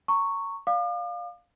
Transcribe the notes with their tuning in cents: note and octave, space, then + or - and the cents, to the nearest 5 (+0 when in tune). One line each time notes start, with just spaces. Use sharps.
A#5 -30 C#6 +0
D5 +0 F5 +10 D6 +45